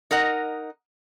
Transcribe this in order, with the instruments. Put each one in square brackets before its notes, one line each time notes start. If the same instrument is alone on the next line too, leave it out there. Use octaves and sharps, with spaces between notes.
[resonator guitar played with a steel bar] D#4 A#4 D#5 F#5